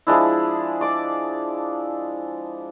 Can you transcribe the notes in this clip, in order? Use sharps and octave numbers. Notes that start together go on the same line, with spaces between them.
F3 G#3 D4 E4
D5 D6